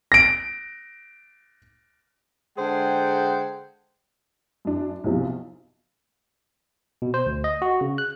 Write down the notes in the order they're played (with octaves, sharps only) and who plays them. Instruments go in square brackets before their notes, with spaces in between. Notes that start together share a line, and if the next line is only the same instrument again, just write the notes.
[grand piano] A#6 D7
[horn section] D3 G#3 G#4 C5 F#5 G5
[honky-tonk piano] F#2 D4
B1 E2 C3 F3
[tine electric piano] B2
C5
D2
D#5
F#4
C#3
F#6